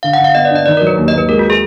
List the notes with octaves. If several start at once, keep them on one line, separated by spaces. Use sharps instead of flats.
D3 F5
F#5
D3
F5
B3 D#5
D5
D4 D#5
D#3 D5
A#4
F#3
B4
D#2
D#5
D#2 B4
G#3 A#4
F#4
G#4